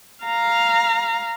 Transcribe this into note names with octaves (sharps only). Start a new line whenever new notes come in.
F5 A#5